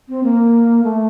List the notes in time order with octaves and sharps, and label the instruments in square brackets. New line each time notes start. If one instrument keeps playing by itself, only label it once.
[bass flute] C4
A#3
A3